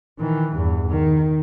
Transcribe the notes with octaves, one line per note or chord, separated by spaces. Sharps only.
D#3 E3
E2 G2
D#3